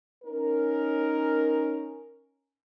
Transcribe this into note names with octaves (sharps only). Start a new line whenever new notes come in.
C#4 D#4 A#4